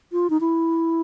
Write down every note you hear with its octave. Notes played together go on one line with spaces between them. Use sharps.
F4
D#4
E4